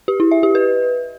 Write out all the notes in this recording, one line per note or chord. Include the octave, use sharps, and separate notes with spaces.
G4
E4
E5
G4
B4